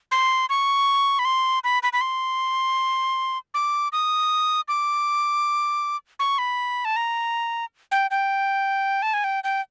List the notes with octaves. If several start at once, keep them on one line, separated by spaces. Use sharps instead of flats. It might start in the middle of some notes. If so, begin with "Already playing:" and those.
C6
C#6
B5
C6
B5
B5
B5
C6
D6
D#6
D6
C#6
B5
A5
A#5
G5
G5
A5
G#5
G5
G5